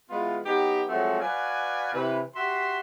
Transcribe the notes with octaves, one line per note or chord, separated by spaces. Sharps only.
E3 G#3 B3 F4
F#3 B3 D#4 G4
F3 F#3 G#3 A3 C4 F#4
F#4 B4 D5 F5 G#5
C3 E3 B4
F#4 G4 E5 C6